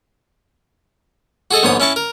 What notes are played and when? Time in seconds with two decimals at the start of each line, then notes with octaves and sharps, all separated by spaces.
1.51 F#4 G#4 A4 D#5
1.63 A#1 G#2 B3 C#5 D#6
1.80 C#4 E4 A5 C#6
1.96 A#4